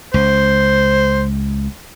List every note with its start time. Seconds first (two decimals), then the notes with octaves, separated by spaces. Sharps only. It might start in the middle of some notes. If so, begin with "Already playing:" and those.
0.14 C#2 C5